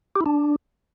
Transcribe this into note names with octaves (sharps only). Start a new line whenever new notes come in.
G4
E4
D4